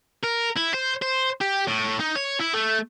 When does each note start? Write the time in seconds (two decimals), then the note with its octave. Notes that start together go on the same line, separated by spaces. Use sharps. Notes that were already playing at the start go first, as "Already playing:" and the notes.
0.24 A#4
0.57 E4
0.74 C5
1.02 C5
1.41 G4
1.68 A2
2.00 D#4
2.16 C#5
2.40 E4
2.54 A3